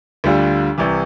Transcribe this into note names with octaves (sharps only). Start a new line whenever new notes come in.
D2 D3 G3 D4 F4
C2 C3 E3